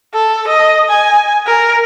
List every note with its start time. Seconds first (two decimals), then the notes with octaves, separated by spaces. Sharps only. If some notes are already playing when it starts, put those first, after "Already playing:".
0.14 A4
0.48 D#5
0.90 G#5
1.47 A#4